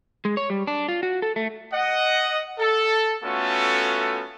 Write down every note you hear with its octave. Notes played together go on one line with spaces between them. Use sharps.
G#3
C#5
G3
D4
F4
F#4
A4
A3
D#5 F#5
A4
A3 B3 C#4 F4 F#4 A4